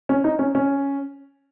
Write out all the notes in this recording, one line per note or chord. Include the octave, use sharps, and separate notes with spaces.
C#4
D#4
C#4
C#4